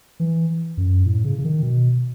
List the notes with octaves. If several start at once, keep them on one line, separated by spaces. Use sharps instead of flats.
E3
F#2
A2
C#3
C#3
D#3
B2